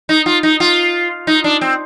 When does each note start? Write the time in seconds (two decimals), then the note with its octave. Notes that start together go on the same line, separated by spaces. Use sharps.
0.09 D#4
0.26 F4
0.43 D#4
0.60 F4
1.27 D#4
1.44 D4
1.61 C4